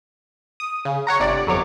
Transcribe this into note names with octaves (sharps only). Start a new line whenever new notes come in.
D#6
C#3
C#5 F#5 A#5
G1 C3 D5
G1 F2 F#3 C#5 D6